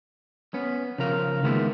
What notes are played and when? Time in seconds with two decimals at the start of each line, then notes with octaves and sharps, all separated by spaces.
0.54 B3 C#4
0.98 C#3 F3 A#4 F5
1.43 D#3 G#3 A#3 B3 E4 F4